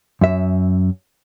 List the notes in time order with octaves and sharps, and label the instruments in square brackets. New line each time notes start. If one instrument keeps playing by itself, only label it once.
[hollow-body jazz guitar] F#2 E5